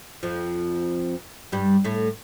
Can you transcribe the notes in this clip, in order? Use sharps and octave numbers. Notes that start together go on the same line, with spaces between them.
F2 F3
G2 G3
A2 A3